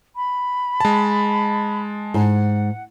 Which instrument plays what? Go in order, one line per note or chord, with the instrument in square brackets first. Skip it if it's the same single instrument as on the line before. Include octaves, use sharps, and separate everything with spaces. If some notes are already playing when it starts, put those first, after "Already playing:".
[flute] B5
[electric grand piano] G#3 A5
[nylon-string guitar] G#2 [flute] F#5